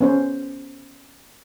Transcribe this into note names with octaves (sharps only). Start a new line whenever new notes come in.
B3 C#4 C5